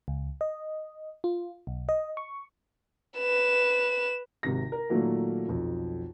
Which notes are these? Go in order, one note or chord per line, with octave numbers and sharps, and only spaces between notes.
C#2
D#5
F4
B1
D#5
C#6
B4 E7
G#1 C3 A#6
A#4
A#2 D#3 F#3 A3 A#3
B1 F2